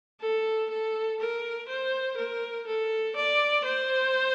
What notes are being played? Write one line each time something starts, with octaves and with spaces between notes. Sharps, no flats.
A4
A4
A#4
C5
A#4
A4
D5
C5